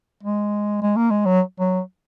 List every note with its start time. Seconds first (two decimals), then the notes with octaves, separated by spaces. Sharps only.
0.23 G#3
0.82 G#3
0.96 A#3
1.11 G#3
1.26 F#3
1.60 F#3